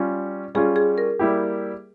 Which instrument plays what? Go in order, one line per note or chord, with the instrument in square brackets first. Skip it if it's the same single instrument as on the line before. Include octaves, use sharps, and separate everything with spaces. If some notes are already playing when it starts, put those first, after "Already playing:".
Already playing: [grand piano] G3 C#4 F4
[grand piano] G3 C#4 F4 [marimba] G#4
[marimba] G#4
A#4
[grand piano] G3 A#3 E4 G4